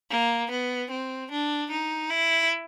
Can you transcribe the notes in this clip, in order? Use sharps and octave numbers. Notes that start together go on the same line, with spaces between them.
A#3
B3
C4
D4
D#4
E4